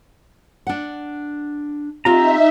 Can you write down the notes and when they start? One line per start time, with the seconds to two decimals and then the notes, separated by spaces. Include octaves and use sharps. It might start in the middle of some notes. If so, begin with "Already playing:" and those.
0.67 D4 F#5
2.05 C4 D#4 F4 G4 E5 A#5